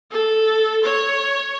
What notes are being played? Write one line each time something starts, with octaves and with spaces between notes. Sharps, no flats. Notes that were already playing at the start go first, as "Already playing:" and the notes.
A4
C#5